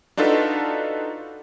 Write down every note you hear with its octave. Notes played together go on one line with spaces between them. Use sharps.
D4 D#4 F4 F#4 A4 B4